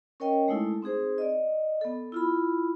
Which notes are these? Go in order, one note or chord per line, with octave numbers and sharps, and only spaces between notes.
C#4 A#4 C#5 D#5 G5
G#3 A3 D#4 E4 A4
C4 D#4 G#4 C5
D5 D#5
B3 A4
E4 F4 B5